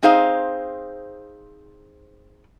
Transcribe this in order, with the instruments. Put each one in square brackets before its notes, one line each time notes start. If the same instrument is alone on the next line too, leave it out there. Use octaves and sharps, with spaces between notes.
[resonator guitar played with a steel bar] C4 D#4 G#4 C5 F5